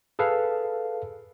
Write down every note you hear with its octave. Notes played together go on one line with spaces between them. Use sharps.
G#4 A4 B4 F5